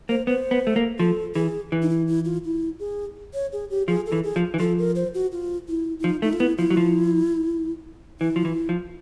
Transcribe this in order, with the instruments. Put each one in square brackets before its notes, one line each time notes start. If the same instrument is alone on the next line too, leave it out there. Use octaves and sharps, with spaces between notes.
[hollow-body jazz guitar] A#3 [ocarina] C5
[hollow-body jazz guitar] B3 [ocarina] C5
[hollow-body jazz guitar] B3
A3
A#3
[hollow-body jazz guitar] F3 [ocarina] A4
[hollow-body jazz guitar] E3 [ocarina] G#4
[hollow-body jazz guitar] E3
[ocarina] D#4
E4
E4
F4
E4
G#4
C#5
G#4
G4
[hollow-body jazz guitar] F3 [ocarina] G#4
[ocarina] A4
[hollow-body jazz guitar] E3
[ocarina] G#4
[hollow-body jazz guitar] F3
E3
[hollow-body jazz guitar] F3 [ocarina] A4
[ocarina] A#4
C5
F#4
F4
E4
E4
[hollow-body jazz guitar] F3 [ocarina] D#4
[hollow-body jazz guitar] A3 [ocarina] D#4
[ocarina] F4
[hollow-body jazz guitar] B3 [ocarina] E4
[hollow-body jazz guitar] F3 [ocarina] E4
[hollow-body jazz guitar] F#3
F3
[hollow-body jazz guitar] E3 [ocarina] E4
[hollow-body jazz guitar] F3
E3
F3